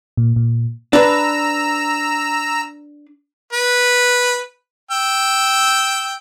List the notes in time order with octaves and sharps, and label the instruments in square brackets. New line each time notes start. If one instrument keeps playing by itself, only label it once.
[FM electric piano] A#2
A#2
[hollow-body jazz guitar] D4 B4 [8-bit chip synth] A#5 E6
[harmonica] B4
G5 E6